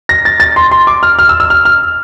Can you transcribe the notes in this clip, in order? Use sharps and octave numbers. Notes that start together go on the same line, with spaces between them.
A#6
A6
A6
C6
C6
D6
F6
F6
E6
E6
F6
F6